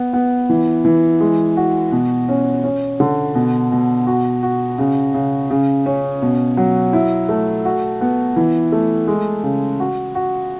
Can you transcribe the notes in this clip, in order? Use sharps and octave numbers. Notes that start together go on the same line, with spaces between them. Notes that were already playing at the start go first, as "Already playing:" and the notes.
Already playing: B3
B3
E3
E3
G#3
F#4
B2
C#4
C#4
D3
B2
B2
F#4
F#4
C#3
C#3
C#3
C#4
B2
F#3
E4
A3
F#4
B3
E3
A3
G#3
C#3
F#4
F#4